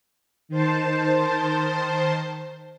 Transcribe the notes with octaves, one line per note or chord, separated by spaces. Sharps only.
D#3 C5 A5